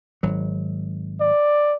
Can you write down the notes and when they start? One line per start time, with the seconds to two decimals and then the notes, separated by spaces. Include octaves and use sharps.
0.23 G#1 F#3
1.21 D5